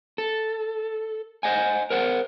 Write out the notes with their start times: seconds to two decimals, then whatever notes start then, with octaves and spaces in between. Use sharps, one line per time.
0.18 A4
1.43 C5 D#5 F#5 G#5
1.90 A#4 C5 F#5